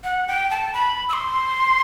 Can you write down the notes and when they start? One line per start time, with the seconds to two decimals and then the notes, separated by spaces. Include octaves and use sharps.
0.04 F#5
0.28 G5
0.51 A5
0.74 B5
1.09 E6
1.13 C6